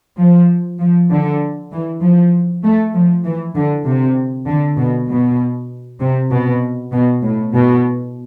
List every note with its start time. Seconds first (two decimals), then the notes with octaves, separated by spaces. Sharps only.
0.19 F3
0.80 F3
1.10 D3
1.72 E3
2.02 F3
2.63 A3
2.95 F3
3.25 E3
3.55 D3
3.86 C3
4.47 D3
4.78 B2
5.09 B2
6.00 C3
6.31 B2
6.92 B2
7.23 A2
7.54 B2